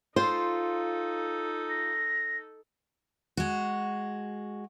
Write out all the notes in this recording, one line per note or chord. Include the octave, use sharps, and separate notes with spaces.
D#4 F4 A4 C5
A#6
G#3 F#4